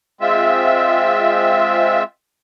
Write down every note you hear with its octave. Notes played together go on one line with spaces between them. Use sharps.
G#3 C4 F4 E5